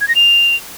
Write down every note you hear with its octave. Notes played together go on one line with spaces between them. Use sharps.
G#6
A#6
F7